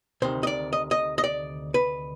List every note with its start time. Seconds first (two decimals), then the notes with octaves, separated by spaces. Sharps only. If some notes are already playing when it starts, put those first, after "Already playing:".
0.22 D2 C3 D#3 C5
0.43 D#5
0.47 D5
0.73 D#5
0.91 D#5
1.18 D#5
1.24 D5
1.74 B4